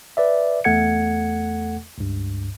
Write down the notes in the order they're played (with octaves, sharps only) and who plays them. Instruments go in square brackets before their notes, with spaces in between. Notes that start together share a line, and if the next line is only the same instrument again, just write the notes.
[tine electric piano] B4 D5 E5
E2 A3 A4 F#5 G#6 C#7
C#2 G2